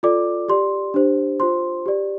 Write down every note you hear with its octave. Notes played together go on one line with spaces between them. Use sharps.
F4 A4 D5 D6
G4 D5 C6
D4 G4 C5
F4 C5 C6
G4 D5